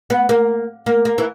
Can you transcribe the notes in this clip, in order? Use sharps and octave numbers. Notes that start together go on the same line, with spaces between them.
B3
A#3
A#3
A#3
E3